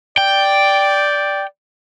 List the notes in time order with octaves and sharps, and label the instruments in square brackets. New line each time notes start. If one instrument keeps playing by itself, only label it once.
[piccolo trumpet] D5 [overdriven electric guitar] G5